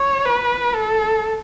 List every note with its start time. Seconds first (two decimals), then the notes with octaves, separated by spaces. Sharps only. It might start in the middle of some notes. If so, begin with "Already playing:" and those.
Already playing: C#5
0.26 B4
0.75 A4